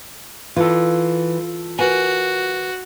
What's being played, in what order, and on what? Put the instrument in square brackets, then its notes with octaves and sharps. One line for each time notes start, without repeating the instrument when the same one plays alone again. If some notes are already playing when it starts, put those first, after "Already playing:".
[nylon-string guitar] E3 [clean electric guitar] F4 A4
[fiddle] F#4 [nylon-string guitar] A#4 B4 G#5